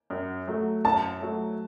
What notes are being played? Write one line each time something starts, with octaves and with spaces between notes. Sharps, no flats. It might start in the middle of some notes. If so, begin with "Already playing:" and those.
F#2
F#3 A3
F#2 A5
F#3 A3